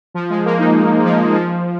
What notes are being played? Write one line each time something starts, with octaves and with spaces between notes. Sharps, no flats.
F3
G#3
A#3
D#4
F3
G#3
F3